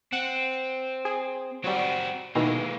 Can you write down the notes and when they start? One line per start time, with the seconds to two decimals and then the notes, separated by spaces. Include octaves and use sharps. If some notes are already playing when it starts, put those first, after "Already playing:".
0.13 C4 F#5
1.05 G#4
1.64 F#3 G3 C4 F#4
2.35 B2 D#3 E3 G#3 A#3